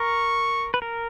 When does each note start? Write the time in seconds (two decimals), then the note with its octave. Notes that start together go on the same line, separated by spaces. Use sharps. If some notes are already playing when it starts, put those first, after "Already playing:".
Already playing: A#4 C#6
0.74 B4
0.82 A#4